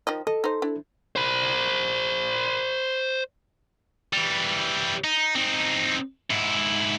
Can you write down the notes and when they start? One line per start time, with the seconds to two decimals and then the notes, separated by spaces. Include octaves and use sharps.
0.07 D#3 F3 D#5
0.27 A4 D#5
0.44 D#4 C5
0.62 D4 E4
1.16 C5 B5
4.13 E3 G3
5.04 D#4
5.35 C4 D#4
6.30 G#2 E4